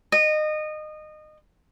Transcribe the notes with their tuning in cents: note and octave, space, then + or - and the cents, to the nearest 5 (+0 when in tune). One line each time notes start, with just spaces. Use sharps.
D#5 -25